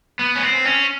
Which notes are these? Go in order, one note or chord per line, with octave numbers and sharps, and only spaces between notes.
B3
C#4
C4
C#4